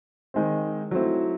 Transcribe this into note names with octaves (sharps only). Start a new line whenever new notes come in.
D#3 G#3 C4
F#3 A3 C4 E4